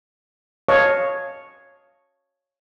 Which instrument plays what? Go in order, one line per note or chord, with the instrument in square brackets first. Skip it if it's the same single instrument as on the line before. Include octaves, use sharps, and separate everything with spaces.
[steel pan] C#5 D#5 F5 A5 C#6